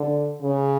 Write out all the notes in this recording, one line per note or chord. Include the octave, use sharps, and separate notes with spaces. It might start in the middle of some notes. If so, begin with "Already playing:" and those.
Already playing: D3
C#3